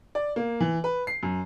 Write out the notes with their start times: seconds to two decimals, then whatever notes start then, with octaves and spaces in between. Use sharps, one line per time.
0.15 D5
0.36 A#3
0.60 E3
0.84 B4
1.07 C7
1.23 F#2